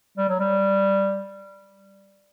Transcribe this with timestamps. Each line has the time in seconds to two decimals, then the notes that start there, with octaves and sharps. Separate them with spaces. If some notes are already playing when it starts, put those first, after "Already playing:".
0.18 G3
0.29 F#3
0.40 G3